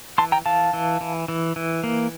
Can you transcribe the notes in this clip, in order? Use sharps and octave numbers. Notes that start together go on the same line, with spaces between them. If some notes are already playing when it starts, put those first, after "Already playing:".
E3 A5 C6
G5 A#5
E3 F5 A5
E3
E3
E3
E3
A#3